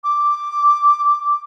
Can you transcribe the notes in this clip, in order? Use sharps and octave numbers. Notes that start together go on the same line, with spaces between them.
D6